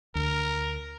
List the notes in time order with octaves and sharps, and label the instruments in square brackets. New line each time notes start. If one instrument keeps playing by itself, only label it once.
[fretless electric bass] D2 [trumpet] A#4